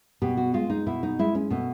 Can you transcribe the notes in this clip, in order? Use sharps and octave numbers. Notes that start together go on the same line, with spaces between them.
B2 G4
F#4
G#3 F4
D#4
B2 E4
D#4
G#3 E4
C#4
B2 A3